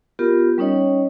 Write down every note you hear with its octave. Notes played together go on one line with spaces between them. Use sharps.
B3 F4 G4 A#4
G3 C#4 D#4 C#5 D#5